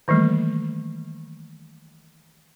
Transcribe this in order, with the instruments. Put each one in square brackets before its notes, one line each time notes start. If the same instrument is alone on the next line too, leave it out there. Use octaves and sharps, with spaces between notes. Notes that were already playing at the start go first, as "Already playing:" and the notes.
[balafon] D#3 E3 G3 A3 A#3